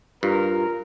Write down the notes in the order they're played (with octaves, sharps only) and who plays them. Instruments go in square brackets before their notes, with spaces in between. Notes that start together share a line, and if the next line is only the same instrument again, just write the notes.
[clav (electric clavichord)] G2 [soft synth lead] F4 [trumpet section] A#4